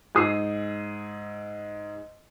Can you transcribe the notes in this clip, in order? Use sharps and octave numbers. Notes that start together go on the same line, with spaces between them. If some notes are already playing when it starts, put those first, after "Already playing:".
G#2 G#4 D#6 E6 C7